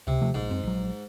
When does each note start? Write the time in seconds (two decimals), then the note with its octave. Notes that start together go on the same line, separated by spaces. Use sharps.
0.07 C#2 C3
0.21 D#2 F3 A3
0.34 A#1 G#2
0.51 F#2 C4
0.64 A#1 F#3